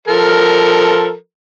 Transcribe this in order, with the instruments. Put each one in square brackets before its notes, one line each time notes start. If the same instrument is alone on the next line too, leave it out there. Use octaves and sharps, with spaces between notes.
[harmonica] F3 A4 A#4